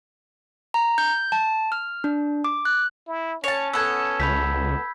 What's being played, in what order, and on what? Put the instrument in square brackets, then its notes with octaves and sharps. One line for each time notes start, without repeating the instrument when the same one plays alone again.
[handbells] A#5
G6
A5
F6
D4
D6
F#6
[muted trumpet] E4
[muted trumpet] C#4 [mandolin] C#5 A5
[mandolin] B3 A4 [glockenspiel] E6 G#6
[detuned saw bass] C#2 [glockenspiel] B5 G6 B6